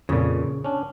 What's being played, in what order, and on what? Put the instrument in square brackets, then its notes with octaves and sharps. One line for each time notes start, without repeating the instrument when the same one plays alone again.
[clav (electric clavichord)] F2 A#2 [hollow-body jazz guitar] C#3
[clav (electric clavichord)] C#4 D4